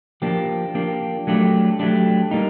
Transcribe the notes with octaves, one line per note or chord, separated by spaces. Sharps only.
F3 A#3 D4 G4
F3 A#3 D4 G4
F#3 A3 D4 G4
F#3 A3 D4 G4
G3 A#3 D#4